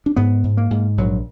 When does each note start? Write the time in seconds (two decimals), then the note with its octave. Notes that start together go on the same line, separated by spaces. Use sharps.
0.06 D4
0.16 G#2 B3
0.44 G#2
0.57 A#3
0.71 G#2
0.98 A#1 F#3